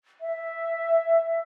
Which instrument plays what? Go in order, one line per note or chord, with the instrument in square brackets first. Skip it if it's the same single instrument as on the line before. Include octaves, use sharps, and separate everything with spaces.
[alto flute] E5